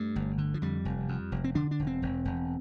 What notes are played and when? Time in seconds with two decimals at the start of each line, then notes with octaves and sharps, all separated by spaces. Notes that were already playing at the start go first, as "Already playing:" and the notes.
Already playing: G2 A3
0.16 G1
0.38 D3
0.54 F3
0.62 F2 G3
0.85 F1
1.09 F2
1.32 F1
1.44 C4
1.55 D3 D4
1.71 D4
1.80 E1
1.87 C4
2.02 E1
2.25 E1